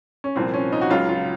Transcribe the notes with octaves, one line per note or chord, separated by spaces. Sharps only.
C#4
C2 A#2 F3 C4
C#4
D#4
F#4
C#2 C#3 F#3 F4
F4